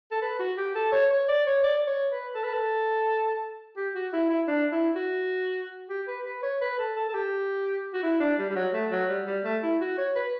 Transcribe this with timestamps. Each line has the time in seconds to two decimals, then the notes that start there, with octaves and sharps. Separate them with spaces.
0.11 A4
0.22 B4
0.40 F#4
0.57 G4
0.75 A4
0.92 C#5
1.11 C#5
1.28 D5
1.47 C#5
1.64 D5
1.87 C#5
2.12 B4
2.35 A4
2.44 B4
2.53 A4
3.77 G4
3.95 F#4
4.13 E4
4.30 E4
4.48 D4
4.72 E4
4.96 F#4
5.90 G4
6.08 B4
6.26 B4
6.43 C#5
6.61 B4
6.79 A4
6.96 A4
7.09 A4
7.14 G4
7.94 F#4
8.03 E4
8.20 D4
8.39 G3
8.50 G3
8.56 F#3
8.73 A3
8.91 F#3
9.09 G3
9.27 G3
9.44 A3
9.63 E4
9.81 F#4
9.98 C#5
10.16 B4